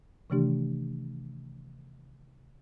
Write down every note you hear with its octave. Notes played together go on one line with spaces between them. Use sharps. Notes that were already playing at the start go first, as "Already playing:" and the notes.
C3 D#3 E3 A3 D4 G4